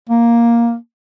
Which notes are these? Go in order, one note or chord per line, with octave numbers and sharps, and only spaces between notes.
A#3